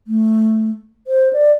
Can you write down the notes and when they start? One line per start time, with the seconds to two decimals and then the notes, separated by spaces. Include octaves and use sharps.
0.07 A3
1.07 C5
1.33 D5